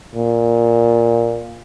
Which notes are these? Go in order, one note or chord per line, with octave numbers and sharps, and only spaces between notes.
A#2